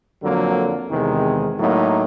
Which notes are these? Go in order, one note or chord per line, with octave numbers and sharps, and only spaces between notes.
F2 D3 F#3 A#3
E2 C3 D#3 G#3
A2 F#3 A#3 D#4